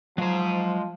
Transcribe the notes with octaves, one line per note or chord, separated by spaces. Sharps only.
F3 F#3 G#3 C5 A#5